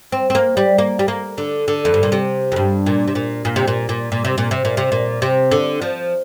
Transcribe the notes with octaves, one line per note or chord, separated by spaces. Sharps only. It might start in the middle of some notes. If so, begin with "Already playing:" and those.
C4
C4
A#3
G3
A#3
G3
A#3
D3
D3
F2
G2
A#2
C3
F2
G2
A#2
C3
A#2
A#2
C3
A#2
A#2
A#2
C3
A#2
C3
A#2
C3
A#2
C3
D3
F3